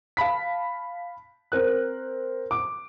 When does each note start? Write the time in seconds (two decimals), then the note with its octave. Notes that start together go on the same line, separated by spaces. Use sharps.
0.17 F5 A5 B5 B6
1.52 C4 A#4 F#6
2.51 D6